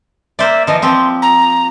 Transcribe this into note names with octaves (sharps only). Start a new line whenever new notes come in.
A#3 C5 D5 E5
E3 F3 D#5
F3 C4 G4 C6
A#5